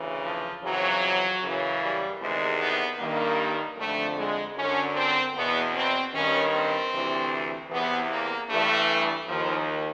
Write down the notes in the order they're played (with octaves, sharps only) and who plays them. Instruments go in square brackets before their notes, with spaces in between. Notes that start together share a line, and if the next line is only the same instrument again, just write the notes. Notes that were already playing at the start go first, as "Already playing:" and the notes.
Already playing: [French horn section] D2 C#3 E3
F3
F2 C#3 E3 F#3
F#2 C#3 E3
G3
E2 C3 D#3 G#3
B3
G2 D#3 A#3
F2 D3 A3
G#3
F#2 D3 C#4
C4
E2 B2 B3
C4
G2 D#3 C#4
C4
D2 C3 E3
E2 C3 E3 B3
A#3
G2 E3 A3
D#2 D#3 F3